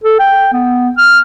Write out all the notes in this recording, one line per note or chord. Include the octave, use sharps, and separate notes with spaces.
A4
G5
B3
F6